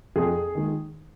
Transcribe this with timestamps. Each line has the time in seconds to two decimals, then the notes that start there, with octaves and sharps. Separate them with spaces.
0.16 F2 G#4
0.55 D#3 G#3